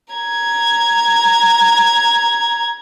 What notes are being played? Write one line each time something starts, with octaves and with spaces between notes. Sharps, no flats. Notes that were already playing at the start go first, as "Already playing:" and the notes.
A#5 G#6